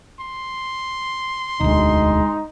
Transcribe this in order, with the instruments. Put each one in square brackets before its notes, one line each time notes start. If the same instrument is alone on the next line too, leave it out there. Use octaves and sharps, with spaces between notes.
[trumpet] C6
[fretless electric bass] E1 D2 [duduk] G#3 [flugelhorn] D#4